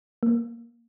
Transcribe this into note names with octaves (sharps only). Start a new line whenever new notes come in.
A#3